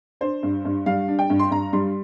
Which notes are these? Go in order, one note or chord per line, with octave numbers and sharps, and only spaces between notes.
D4 C5
G2
G2
G3 F5
D4
G5
G2
C6
G2 A#5
G3 C6